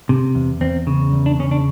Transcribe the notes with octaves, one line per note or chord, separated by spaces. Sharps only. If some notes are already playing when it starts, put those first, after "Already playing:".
C3
E2
E2 C4
C#3
E2
D4
C#3 C#4
D4